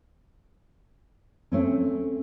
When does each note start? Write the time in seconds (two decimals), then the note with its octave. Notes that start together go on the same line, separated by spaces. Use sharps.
1.52 A3 C4 C#4